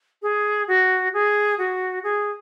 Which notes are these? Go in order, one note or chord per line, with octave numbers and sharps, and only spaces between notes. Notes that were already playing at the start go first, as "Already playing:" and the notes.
G#4
F#4
G#4
F#4
G#4